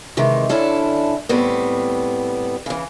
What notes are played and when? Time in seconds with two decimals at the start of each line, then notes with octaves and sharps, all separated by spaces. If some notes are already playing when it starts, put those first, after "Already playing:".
0.17 C3 D#3 E3 G#3
0.49 D3 C#4 D4 E4 A4
1.29 A2 G3 B3 C4
2.66 C#3 E3